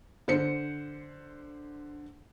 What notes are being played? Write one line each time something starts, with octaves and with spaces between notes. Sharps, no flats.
D3 C5 C#7